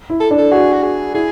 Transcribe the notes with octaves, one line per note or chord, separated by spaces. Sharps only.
E4
A4
D4
A4
F#4 G#4
F#4
G#4
E4 G#4